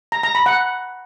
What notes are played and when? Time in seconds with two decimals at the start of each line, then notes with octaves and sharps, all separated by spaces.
0.12 A#5
0.23 A#5
0.35 B5
0.46 F#5